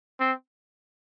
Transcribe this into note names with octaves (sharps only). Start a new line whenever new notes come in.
C4